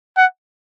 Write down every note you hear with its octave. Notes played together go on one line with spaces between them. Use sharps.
F#5